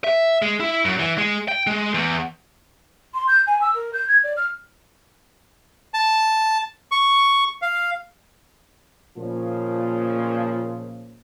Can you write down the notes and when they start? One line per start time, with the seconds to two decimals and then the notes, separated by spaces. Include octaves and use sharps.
0.04 E5
0.42 G#3
0.60 E4
0.85 F#2
0.99 E3
1.18 G#3
1.48 G5
1.67 G#3
1.94 E2
3.14 C6
3.27 G6
3.47 G#5
3.61 E6
3.74 A#4
3.93 G6
4.08 G#6
4.23 D5
4.36 F6
5.94 A5
6.92 C#6
7.62 F5
9.18 A#2 C#3 F3